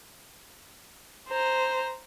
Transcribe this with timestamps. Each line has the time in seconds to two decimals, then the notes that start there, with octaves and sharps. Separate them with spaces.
1.28 C5 A#5